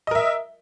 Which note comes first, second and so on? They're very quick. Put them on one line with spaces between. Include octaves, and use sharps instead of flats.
D#5 A#4 E5